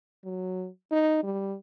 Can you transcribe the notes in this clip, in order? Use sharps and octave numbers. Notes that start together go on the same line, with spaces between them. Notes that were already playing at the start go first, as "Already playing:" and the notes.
F#3
D#4
G3